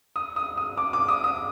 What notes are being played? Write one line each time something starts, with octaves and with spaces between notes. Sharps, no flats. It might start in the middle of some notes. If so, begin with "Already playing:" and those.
D#6
D#6
D#6
D6
D6
D#6
D#6